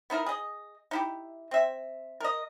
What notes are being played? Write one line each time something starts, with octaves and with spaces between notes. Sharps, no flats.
B3 D#4 E4 A#4
G#4 D#5
D#4 E4 G4
C4 E5
A#4 D#5